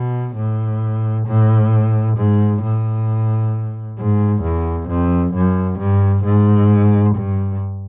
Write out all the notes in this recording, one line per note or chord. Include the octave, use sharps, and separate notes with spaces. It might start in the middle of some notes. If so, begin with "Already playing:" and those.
Already playing: B2
A2
A2
G#2
A2
G#2
E2
F2
F#2
G2
G#2
G2